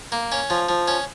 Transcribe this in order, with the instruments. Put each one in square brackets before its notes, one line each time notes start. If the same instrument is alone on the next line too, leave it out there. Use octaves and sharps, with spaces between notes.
[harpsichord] A#3
C#4
F3
F3
C#4